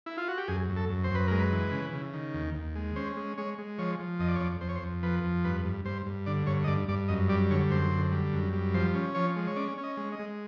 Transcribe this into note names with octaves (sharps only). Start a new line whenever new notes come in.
E4
F4
F#4
G4
F#2 G#4
F#2
A4
F#2
C5
F#2 B4
G#3 A#4
B4
E3
C#3
C#3
D#3
D#2
D#2
G#3
C#4 C5
G#3
G#3 C#5
G#3
F3 C#5
F3
F2 D#5
D5
C#5
F2 D5
F2 C5
C#5
C5
F2
F3 B4
F2
G2 B4
G2
G2 C5
G2
D3 D5
G2 C#5
D#5
G2 D5
G2 D5
F#2 D#5
G3 D5
D3 C#5
F#2 C5
D3
G3
F#2
G3
F3 C5
C#4
F3 C#5
G#3
C#5
C#4 D5
C#4
D#5
G#3
D#5
G#3